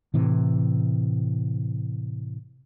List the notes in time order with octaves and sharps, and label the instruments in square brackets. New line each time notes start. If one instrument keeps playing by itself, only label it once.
[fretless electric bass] A2 C3 E3